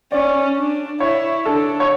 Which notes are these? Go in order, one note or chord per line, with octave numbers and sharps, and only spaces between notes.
C#4 D5
D4
E4 C#5
D4 A4
C#5